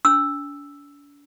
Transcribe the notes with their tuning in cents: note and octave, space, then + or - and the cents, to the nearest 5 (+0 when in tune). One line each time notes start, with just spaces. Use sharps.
D4 -40 E6 +0